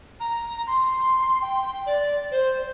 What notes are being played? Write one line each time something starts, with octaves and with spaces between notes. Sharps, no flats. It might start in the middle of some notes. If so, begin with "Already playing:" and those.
A#5
C6
G5
D5
C5